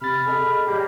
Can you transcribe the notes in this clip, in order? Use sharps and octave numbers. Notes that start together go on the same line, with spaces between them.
C3 B5 F6 A6
G#4 A4 D#5
A2 G3 A#3 G4